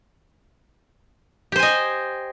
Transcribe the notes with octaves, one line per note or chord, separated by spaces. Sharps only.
G4 C5 D#5 G#5